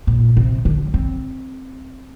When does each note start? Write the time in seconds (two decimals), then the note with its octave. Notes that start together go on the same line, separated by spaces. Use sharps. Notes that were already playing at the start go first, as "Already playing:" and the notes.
0.07 A#2
0.37 C3
0.65 D3
0.94 C4